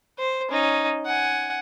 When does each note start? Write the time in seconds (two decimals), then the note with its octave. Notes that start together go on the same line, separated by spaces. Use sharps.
0.18 C5
0.49 C#4 D#4
1.06 F#5 G#5